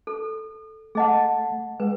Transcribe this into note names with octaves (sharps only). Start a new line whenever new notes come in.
A4
A3 G#4 D#5 F#5 A5
G#3 B4